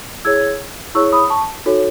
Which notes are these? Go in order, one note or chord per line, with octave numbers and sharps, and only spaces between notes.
E4 G#4 C#5 E6 G#6
E4 G#4 C#5 C#6 E6
B5 D#6
A5 C#6
D#4 F#4 A4 C#5